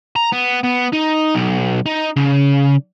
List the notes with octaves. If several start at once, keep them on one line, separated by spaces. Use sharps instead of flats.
A#5
B3
B3
D#4
B1
D#4
C#3